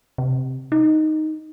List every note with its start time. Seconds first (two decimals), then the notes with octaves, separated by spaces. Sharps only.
0.18 C3
0.72 D#4